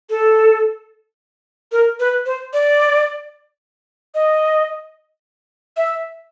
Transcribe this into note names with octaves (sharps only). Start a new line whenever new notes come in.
A4
A#4
B4
C5
D5
D#5
E5